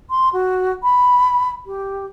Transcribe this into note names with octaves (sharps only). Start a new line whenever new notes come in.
C6
F#4
B5
G4